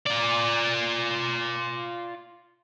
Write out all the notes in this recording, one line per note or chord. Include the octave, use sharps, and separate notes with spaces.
F4 D5